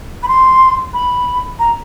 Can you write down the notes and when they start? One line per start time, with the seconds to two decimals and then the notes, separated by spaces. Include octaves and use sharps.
0.23 B5
0.28 C6
0.94 B5
1.59 A#5